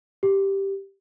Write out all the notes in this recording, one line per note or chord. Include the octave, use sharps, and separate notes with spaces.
G4